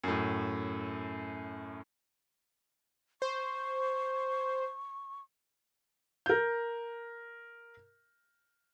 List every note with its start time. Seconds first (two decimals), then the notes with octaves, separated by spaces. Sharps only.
0.04 F#2 A2
3.22 C5 C#6
6.26 A#4 G6